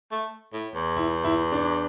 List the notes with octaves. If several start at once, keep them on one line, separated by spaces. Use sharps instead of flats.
A3
A2
E2
E4
E4
D4